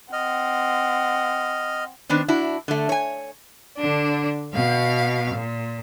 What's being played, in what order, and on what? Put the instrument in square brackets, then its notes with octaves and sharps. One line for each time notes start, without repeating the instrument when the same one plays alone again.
[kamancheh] C4 F#5 [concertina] D#5 F6
[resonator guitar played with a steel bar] D#3 B3 C4 D4
D4 E4 F#4
D3 A3
C#5 G#5
[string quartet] D3 D4
B2 F5
A#2